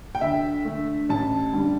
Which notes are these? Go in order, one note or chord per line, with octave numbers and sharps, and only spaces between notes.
G5
D2 E5
D3 A3
A1 A5
G2 D3 G3